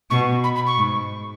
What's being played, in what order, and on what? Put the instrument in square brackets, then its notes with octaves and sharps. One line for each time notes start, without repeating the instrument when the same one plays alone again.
[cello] B2 [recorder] C#6
[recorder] B5
B5
C#6
[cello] G#2